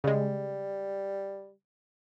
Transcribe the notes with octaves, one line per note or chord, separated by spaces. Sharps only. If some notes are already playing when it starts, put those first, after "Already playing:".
C#3 G3 G#3